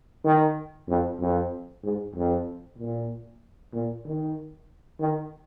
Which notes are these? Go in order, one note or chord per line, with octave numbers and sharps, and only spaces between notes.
D#3
F2
F2
G#2
F2
A#2
A#2
D#3
D#3